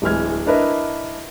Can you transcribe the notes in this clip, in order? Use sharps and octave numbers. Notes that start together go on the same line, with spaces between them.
D1 E3 G#3 F6 G#6
D4 E4 A#4 B4 D#5 E5